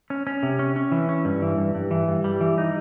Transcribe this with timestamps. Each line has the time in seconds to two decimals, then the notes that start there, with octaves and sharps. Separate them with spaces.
0.10 C#4
0.27 C#4
0.43 C3
0.59 C#4
0.76 C#4
0.92 E3
1.09 C#4
1.25 G2
1.42 E3
1.58 G2
1.75 G2
1.91 E3
2.08 G2
2.24 G3
2.41 E3
2.58 D#4